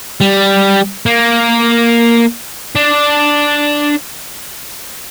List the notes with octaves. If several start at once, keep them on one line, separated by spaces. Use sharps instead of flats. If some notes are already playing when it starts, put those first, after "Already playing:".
G3
A#3
D4